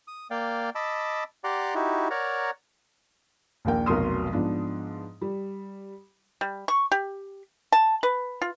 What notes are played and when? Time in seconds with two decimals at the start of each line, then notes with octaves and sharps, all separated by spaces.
0.08 D#6
0.31 A#3 D5 F5 G5
0.75 D#5 A5 B5 D6 E6
1.44 G4 D5 F#5 A#5 C6 D6
1.75 D#4 E4 F#4 G4
2.10 A#4 C#5 D5 F#5 A#5
3.65 A#1 D#2 A#3 G5
3.86 F1 B1 F#3 A#4 C6 D#6
4.32 G#2 F3 B3 D4
5.21 G3
6.41 G3
6.68 C#6
6.92 G4
7.72 A5
8.03 B4
8.42 F4